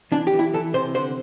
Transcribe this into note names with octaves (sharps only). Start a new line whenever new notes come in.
E3 D4
G4
E3
E4
E3 A4
C3 C5
D3 C5